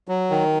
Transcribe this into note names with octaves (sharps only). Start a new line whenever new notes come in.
F#3
D#3